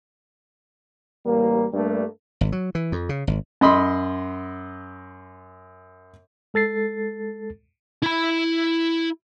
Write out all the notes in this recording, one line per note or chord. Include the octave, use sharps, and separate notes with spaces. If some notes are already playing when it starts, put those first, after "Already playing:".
A1 G3 A#3
G2 G3 A3 A#3 D4
G#1
F#3
E3
F2
C#3
G#1
F#2 D#5 B5 C6
G#3 A4 A6 C7
E4 B5